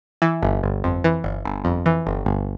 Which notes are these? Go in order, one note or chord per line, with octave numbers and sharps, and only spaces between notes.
E3
G1
G1
F2
E3
G1
G1
F2
E3
G1
G1